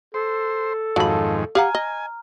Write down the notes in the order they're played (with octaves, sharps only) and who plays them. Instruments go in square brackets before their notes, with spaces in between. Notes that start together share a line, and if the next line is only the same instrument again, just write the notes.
[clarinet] A4 [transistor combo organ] C5
[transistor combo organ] F2 G#2 D#3 [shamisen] F#3 B5 [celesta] F5 A5
[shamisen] G4 F5 F#5 [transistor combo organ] G#5 [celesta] A#5 F6
[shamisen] D#5